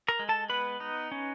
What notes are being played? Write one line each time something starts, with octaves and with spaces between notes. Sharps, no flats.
A#4 A#5
G#3
A4 A5
B3 B4 B5
D#4
C#4